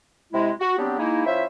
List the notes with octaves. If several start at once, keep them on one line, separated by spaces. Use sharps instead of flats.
C3 G#3 E4
F#4
F#3 G3 B3 C4 D4 G4
G#3 A#3 D#4 E4
F3 C#4 E4 C5 E5